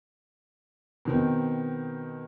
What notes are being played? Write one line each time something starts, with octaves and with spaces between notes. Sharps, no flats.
B2 D#3 C4